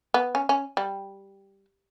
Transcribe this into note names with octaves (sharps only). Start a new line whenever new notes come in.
B3
C#4
C#4
G3